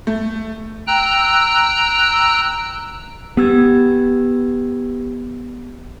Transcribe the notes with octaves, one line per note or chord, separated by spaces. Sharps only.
A3
G5 A#5 E6 F#6
B3 G4 E6 G#6